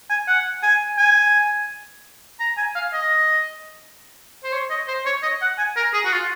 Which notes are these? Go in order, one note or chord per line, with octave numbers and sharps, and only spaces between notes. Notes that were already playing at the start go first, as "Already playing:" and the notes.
G#5
F#5
G#5
G#5
A#5
G#5
F5
D#5
C5
C#5
D#5
C5
C#5
D#5
F#5
G#5
A#4
G#4
F#4
F4